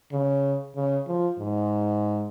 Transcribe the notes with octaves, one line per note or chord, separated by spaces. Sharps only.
C#3
C#3
F3
G#2